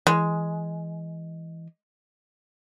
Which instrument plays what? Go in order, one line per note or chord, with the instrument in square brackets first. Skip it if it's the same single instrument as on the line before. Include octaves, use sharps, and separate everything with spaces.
[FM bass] E3 [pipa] G#3